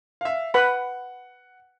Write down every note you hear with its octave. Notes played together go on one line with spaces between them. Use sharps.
E5 F5
B4 F#5 B5